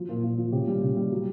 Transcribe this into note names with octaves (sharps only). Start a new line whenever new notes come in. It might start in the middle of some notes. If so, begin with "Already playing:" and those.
Already playing: F3 F#3
A#2
A#2
F3
C#3 G4
G3
C#3
G3
F#3